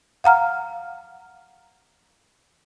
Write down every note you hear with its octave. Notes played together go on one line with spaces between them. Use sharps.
F5 F#5 A#5 F6